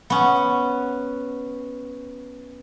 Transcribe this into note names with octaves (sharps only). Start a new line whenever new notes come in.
B3 C#4